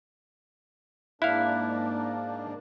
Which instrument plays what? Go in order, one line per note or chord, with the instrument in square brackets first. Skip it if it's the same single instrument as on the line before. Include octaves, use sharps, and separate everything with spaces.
[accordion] G#2 A#3 D4 [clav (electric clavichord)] E4 F5 [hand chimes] F#6